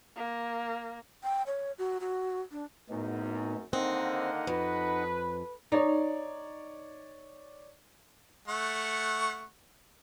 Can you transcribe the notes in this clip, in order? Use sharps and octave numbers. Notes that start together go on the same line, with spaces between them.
A#3
G5
C#5
F#4
F#4
D4
G#1 F#2 A2 B3 D#4
D3 D#3 A#3 C4 D#4 D#5 F#5
F2 B4
D#4 C#5 D5
A3 F#5 C#6